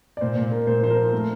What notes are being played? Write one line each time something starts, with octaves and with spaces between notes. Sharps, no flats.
D5
A#2 C5
A#2
A#3
A#2 C5
F3 C5
A#4
A#3
A3